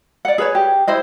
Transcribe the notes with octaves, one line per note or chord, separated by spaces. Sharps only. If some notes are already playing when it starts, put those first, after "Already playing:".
D5 F#5
G#4 B4 C#5
G4
E4 C5 D#5